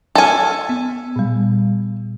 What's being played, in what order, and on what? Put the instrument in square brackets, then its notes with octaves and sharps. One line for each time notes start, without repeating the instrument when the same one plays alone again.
[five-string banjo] A4 G#5 [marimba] D#5 F6
[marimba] B3
A#2 G3